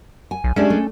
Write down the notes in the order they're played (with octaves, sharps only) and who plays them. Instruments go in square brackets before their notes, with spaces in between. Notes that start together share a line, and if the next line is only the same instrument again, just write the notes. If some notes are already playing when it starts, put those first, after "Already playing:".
[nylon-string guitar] G#5
[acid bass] B1
[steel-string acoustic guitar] G#3 D4 [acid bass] C#4 [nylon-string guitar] G4 D5 E5
[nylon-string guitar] A3